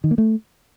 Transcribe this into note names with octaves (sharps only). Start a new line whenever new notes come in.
D#3
A#3
A3